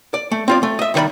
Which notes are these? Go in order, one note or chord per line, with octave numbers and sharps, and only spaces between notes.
D5
A3
C4 F4 D5
A3
D#5 E5
C2 D#3 B4 D5 B5